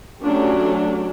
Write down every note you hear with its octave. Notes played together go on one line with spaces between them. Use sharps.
F#3 A3 C#4 D4 G4